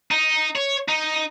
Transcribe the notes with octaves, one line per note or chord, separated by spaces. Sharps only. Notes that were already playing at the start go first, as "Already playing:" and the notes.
D#4
C#5
D#4